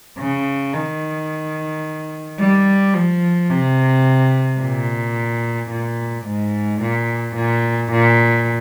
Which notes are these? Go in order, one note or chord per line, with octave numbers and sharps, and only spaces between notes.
C#3
D#3
G3
F3
C3
A#2
A#2
G#2
A#2
A#2
A#2